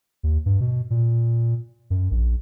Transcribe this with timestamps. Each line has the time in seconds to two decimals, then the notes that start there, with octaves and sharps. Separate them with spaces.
0.23 D#2
0.46 G2
0.61 B2
0.90 A#2
1.90 F#2
2.11 A#1